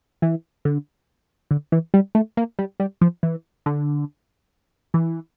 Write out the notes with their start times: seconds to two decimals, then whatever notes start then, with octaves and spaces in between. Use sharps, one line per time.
0.22 E3
0.65 D3
1.51 D3
1.72 E3
1.94 G3
2.15 A3
2.37 A#3
2.59 G3
2.80 G3
3.01 F3
3.23 E3
3.66 D3
4.94 E3